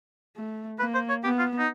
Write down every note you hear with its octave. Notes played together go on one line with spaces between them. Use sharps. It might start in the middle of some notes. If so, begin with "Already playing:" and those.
A3
A#3 B4
C5
C#5
B3 G4
F4
D#4